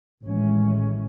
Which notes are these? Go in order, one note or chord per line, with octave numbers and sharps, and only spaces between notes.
A1 A2 D#3 E3 G#3 C#4